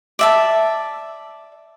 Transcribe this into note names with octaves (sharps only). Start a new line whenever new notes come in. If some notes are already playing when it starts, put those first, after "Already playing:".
D5 E5 A5